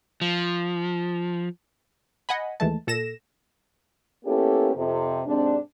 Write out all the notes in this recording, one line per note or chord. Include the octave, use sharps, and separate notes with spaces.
F3
D#5 F#5 G#5 B5
D#2 E3 G#3 A3 A5
A#2 A4 A#6 E7
A#3 B3 C#4 E4 G4 A4
F2 C3
G#2 C3 C4 D4